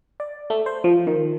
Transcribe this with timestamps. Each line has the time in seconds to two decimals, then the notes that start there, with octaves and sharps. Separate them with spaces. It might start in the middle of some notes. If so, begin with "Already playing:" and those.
0.20 D5
0.50 A3
0.66 C5
0.84 F3
1.07 D#3